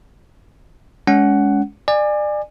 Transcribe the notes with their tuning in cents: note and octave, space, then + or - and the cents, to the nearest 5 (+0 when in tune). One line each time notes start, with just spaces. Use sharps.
G#3 +0 C#4 +30 F#5 +10
D5 +30 G#5 -15